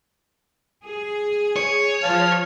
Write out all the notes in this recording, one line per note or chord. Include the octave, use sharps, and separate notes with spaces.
G#4
C#5
F3 F5 A5 F6